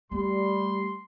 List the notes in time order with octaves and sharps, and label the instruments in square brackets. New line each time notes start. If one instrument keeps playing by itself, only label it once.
[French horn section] G3 [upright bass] A3 [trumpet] C6